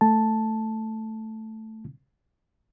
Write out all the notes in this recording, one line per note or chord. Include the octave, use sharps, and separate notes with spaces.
A3 A5